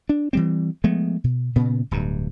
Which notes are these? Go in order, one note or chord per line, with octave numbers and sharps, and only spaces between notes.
D4
E3 G3 C4
F3 G#3 A3 B3
B2
A#2 C#3 B3
D1 G2